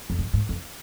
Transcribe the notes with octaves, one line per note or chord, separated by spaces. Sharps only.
F2
G#2
G#2
F2